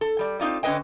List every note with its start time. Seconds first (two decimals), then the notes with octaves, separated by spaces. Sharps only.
0.01 A4
0.19 G3 D5
0.40 C4 D#4 F4 D5
0.63 D3 C#4 D#4 B4 D#5 G5